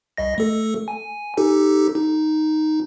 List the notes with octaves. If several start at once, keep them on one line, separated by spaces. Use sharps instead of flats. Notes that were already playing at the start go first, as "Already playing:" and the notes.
C2 D#5 A#6
A3 A4
G#5
D#4 G4 A4
D#4